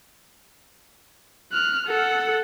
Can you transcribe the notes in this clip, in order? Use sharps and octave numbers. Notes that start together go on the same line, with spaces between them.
F6 F#6
A4 F#5